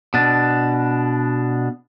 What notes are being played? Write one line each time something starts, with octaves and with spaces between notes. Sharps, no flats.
B2 D4